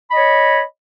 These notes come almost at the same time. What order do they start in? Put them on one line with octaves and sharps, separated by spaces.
B5 D#5 C#5